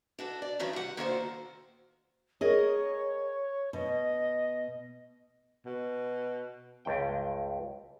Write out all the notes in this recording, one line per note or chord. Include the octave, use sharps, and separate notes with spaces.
D4 F#4 A4
D5
G2 D#3 E3 F#3 C#4
G3 F#5
A#2 D#3 F#4 A4 A#4 C5
G#4 A#4 C#5 D#5
B2 D#5
B2
C#2 G2 G5